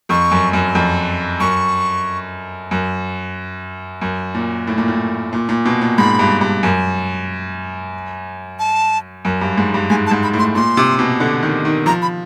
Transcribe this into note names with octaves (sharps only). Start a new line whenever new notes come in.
F2 C#6
F#2
F#2
F2
F#2 C#6
F#2
F#2
A#2
A2
A#2
A2
A#2
A#2
B2
A#2
G#2 B5
G2
G2
F#2
A5
F#2
G2
G#2
G2
G#2 G#5
A5
G#2
B5
A2
C6
A#2 C6
C3
B2
D3
D#3
D#3
F3 A#5
B5